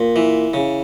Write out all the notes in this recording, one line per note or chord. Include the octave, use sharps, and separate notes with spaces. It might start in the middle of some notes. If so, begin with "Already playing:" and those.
Already playing: A#2
E3
C#3